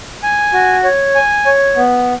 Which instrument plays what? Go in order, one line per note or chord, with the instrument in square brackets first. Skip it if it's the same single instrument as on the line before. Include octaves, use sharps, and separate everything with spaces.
[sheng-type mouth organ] G#5
F#4
C#5
G#5
C#5
B3